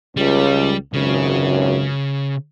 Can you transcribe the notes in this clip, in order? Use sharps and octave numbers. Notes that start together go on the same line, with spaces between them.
C#2 G3
G#1 C#2 F#2 C#3